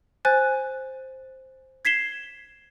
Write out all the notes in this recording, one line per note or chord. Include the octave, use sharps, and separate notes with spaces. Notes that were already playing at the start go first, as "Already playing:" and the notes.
C5 G#5 F#6 A6
G#6 B6 C7 E7 G7